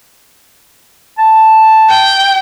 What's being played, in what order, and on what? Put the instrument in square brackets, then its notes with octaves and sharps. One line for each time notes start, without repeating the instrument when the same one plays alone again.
[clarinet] A5
[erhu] G5